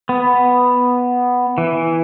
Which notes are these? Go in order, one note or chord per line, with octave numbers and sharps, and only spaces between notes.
B3
E3